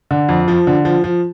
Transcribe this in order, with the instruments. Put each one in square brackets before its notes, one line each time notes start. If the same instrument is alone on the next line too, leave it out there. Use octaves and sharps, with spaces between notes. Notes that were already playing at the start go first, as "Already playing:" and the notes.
[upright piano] D3
F2
F3
D3
F3
F3